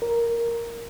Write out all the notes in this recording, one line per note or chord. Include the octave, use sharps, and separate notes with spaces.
A#4